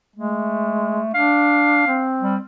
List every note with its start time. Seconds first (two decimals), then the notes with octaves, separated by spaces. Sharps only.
0.16 G#3 A3
1.14 D4 F5
1.87 C4
2.21 G3